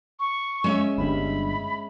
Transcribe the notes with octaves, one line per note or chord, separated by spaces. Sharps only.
C#6
G#3 C#4 E5
G1 G2 B5